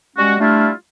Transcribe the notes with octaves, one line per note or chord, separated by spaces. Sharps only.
G3 G#3 C#4 F#4
G3 A3 D4 E4 F4